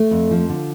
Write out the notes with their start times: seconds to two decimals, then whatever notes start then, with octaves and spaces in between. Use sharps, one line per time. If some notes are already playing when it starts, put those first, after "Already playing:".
Already playing: A3
0.11 F2
0.31 F3
0.49 D3